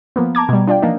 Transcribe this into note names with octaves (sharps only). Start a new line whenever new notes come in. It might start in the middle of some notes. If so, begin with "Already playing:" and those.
F3 A#3 B3
A5 A#5 D6 G#6
B2 G3
D4 F4 D5 G5
E3 F3 A#3 D4 D#4